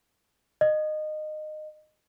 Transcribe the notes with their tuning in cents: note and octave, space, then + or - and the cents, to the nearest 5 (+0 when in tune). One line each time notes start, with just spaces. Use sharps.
D#5 -20